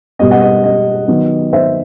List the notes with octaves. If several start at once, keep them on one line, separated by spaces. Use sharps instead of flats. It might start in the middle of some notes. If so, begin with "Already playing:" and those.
B2 G3 B3 D#5
D#5 F#5
D#5
D#5
D#3 F#3 B3
C5 E5